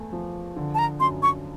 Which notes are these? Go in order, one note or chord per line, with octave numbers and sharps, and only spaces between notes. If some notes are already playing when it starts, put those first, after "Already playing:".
Already playing: E2 A3
F3
D3
A5
A#5
F#2 C6
C#6